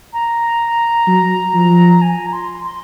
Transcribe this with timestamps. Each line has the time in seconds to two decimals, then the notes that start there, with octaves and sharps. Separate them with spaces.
0.13 A#5
1.07 F#3
1.54 F3
2.02 G#5
2.26 A#5
2.33 C6
2.65 C6